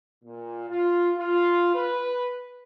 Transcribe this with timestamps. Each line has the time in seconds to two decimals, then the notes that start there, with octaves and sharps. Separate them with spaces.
0.24 A#2
0.69 F4
1.17 F4
1.74 B4